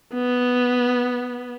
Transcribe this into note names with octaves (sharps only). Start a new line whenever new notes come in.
B3